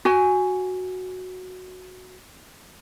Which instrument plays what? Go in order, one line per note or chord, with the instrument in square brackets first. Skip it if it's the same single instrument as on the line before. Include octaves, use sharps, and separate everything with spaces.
[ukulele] F#4 G#5